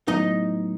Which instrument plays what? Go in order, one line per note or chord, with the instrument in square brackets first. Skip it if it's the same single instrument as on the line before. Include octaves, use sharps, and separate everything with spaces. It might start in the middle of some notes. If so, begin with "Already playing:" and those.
[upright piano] A2 F#3 B3 [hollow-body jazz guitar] D#4 D#5